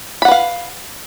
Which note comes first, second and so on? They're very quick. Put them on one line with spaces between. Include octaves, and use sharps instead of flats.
B5 F#5 B4 F5